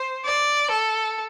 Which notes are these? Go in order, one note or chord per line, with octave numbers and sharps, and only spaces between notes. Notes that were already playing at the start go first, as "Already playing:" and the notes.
Already playing: C5
D5
A4